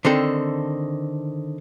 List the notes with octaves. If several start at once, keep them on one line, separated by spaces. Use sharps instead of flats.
D3 D#3 C4 A4